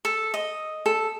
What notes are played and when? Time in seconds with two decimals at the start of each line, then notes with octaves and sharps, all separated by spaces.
0.05 A4
0.34 D#5
0.86 A4